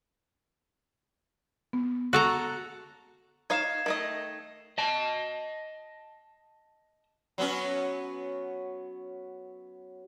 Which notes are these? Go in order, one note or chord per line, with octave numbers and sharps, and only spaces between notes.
B3
F#4 A4 A#5
D#4 C#5 F5 G#6 C7 E7
D#3 A3 D#5
D#5 A5
F#3 B3 C#4